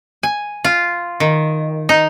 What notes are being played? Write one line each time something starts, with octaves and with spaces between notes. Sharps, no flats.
G#5
F4
D#3
D#4